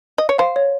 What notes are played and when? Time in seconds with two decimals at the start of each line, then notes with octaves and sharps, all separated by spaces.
0.18 D#5
0.29 C#5
0.38 C5 F5
0.56 C#5